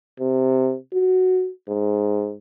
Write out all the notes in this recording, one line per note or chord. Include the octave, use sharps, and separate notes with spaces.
C3
F#4
G#2